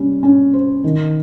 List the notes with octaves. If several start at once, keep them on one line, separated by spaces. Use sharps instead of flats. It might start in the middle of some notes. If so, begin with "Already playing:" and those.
Already playing: G3 C#4
C#4
C5
D#3